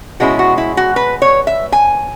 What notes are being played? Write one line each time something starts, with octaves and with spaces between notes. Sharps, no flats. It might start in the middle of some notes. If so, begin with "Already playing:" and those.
B2 G#3 C#4 E4 F#4
F#4
E4
F#4
B4
C#5
E5
G#5